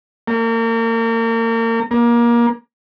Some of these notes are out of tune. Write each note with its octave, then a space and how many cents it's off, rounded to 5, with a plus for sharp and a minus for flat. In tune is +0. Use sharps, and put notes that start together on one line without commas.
A#3 -35
A#3 +25